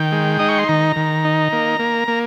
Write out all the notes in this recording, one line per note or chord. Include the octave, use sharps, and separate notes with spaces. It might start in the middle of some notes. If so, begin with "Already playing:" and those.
Already playing: D#3 G5
G#3
D#4 D#6
C#6
C6
D#3 A#5
D#3
D#4
A#3
A#3
A#3